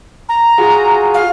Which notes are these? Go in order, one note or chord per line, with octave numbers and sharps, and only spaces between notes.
A#5
F4 F#4 G#4
F5